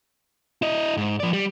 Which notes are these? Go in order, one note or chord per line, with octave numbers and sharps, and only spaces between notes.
E4 D#5
G#2
F3 D5
G3